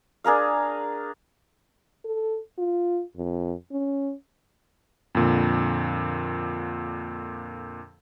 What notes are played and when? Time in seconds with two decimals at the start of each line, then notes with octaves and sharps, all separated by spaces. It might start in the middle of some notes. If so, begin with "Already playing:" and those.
0.24 D4 G#4 A#4 F5
2.05 A4
2.58 F4
3.17 F2
3.72 C#4
5.15 F2 A#2 D3